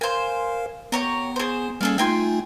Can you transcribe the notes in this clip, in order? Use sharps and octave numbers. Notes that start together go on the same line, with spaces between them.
A#4 C5 F5 G#5
B3 G4 C#5 A#5
G#4 C5
G3 A#3 C#4 G#4 A4 F5
A3 D#4 F4 G5 G#5 C6